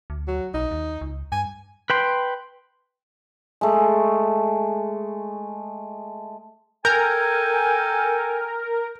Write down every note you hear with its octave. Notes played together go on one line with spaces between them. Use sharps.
D2
F#3
B1 D#4
D#2
C#2
G2 G#5
B4 G5 C6
G#3 A3
A4 A#4 G5 G#5 G6